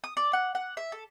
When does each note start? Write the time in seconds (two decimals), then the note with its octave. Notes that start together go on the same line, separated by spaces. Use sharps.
0.04 D#6
0.17 D5
0.33 F#5
0.55 F#5
0.77 E5
0.92 A4